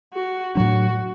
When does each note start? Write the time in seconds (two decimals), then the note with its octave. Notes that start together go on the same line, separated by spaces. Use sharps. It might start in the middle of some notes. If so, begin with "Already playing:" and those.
0.13 F#4
0.55 A2 F#3 D4 F#4